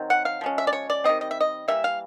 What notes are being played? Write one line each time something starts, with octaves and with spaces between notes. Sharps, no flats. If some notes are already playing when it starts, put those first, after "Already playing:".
Already playing: D#3 F#3 C4
F#5
F5
F3 G#3 C#4
E5
D5
C#5
D5
D#3 G3 C4 D#5
D#5
E5
D#5
E3 G3 A#3 E5
F5